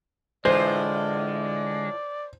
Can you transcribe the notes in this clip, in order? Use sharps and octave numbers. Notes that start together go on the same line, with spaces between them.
A2 D3 E3 G#3 F4 C5 D5